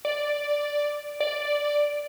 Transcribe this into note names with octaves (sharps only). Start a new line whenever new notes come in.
D5
D5